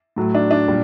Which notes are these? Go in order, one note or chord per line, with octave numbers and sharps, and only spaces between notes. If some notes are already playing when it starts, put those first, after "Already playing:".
A2 F#3 A3
D4
D4
A#2 G3